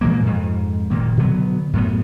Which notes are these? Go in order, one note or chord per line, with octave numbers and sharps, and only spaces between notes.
A#2 E3 G#3 A#3
F2 G#2
F#1 A#2 D#3 A#3
B2 D3 F#3 B3
F#2 A2 B3